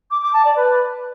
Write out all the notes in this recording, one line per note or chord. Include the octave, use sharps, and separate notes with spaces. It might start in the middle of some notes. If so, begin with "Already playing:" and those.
D6
D6
A5
D5
B4